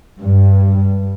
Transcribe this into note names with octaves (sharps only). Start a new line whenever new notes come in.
G2